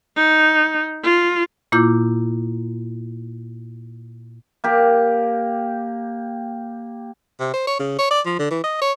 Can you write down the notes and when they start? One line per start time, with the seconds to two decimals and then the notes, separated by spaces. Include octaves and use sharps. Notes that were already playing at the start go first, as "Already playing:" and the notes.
0.16 D#4
1.03 F4
1.72 A#2 A#3 E4 F4 D6 G6
4.64 A#3 G4
7.40 C3
7.54 C5
7.67 C#5
7.80 C#3
7.99 C#5
8.11 D5
8.26 F3
8.39 D3
8.51 E3
8.64 D#5
8.81 C#5